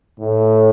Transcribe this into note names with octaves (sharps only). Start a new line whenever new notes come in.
A2